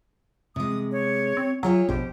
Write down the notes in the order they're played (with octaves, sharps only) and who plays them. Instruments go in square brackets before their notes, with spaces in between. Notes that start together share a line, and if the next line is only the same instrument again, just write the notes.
[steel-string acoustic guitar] C3 G#3 [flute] D#6
[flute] C#5
[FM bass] C4
[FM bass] F#3 [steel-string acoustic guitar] F4 C#5 E5 [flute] G#4
[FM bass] A#1 [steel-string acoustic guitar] B2 C5 [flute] G4